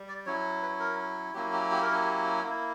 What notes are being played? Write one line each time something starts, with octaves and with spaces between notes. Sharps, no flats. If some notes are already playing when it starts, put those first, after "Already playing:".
Already playing: G3
D5
F#3 C#4 E4 C#5
B4
A#4
F#3 A#3 C#4 E4 G4
G4
G4
A#4
G4
A#3 E4